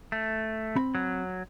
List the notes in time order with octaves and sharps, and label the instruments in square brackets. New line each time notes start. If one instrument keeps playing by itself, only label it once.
[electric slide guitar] A3
[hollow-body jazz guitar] C4 B5
[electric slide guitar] F#3